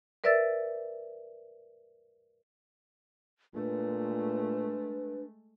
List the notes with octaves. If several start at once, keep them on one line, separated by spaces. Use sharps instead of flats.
A#4 B4 D5 E5 E6 A6
A#2 G#3 A3 D4 B4